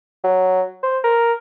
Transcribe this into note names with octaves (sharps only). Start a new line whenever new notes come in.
F#3
C5
A#4